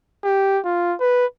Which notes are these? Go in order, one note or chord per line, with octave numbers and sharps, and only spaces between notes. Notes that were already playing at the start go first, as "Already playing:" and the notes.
G4
F4
B4